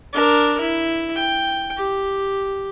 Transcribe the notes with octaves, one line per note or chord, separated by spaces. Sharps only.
D4 A#4
E4
G5
G4